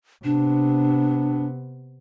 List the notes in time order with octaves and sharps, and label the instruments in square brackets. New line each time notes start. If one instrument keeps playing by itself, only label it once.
[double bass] C3 B3 [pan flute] D4